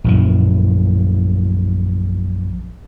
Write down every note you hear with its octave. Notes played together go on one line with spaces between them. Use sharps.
A#1 F#2 E3